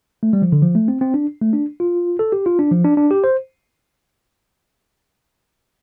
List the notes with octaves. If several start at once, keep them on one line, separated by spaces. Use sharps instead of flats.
A3
G3
F3
D3
F3
A3
C4
C4
D4
A3
D4
F4
A4
G4
F4
D4
F3
D4
D4
G4
C5